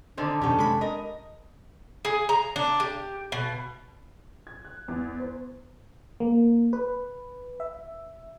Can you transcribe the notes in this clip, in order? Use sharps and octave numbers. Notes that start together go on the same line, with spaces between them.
D3 D#3 D4 C5
F2 B2 D#3 C#4 G4 A4
C3 G#3 B5
A#4 D#5
G#4
A#5
D4
G4
B2
G#6
F#6
E2
C5
A#3
B4
E5